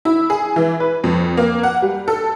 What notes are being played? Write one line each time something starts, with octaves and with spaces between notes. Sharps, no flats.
E4
G#4
E3
B4
F2
A#3
F#5
G3
A4